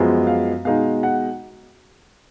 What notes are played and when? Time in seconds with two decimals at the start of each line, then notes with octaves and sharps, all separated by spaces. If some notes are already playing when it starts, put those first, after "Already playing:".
Already playing: F#2 F3 G#3 B3
0.27 F5
0.65 B2 G#3 D#4 F5
1.03 F#5